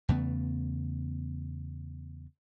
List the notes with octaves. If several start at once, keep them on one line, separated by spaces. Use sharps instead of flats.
E2 C#3 A3 B3